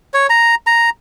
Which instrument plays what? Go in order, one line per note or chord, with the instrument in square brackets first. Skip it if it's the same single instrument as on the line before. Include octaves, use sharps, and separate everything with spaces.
[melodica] C#5
A#5
A#5